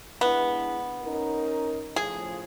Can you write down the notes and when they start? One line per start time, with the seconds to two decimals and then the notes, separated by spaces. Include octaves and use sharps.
0.21 G#3 B3 D4 E4
1.02 C#4 D#4 A#4
1.96 A2 C#3 F3 G#4